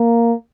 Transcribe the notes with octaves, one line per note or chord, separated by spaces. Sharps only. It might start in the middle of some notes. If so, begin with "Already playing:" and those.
Already playing: A#3